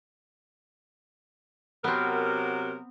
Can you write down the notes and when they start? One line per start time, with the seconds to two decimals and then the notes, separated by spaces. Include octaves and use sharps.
1.84 C3 F#3 B3 C4 A#4